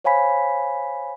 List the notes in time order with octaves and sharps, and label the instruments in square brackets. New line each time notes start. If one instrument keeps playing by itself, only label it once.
[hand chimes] C5 C#5 F5 G#5 B5 B6